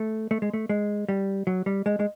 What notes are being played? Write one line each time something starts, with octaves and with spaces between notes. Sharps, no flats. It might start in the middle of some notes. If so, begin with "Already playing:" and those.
Already playing: A3
A3
G#3
A3
G#3
G3
F#3
G3
G#3
G#3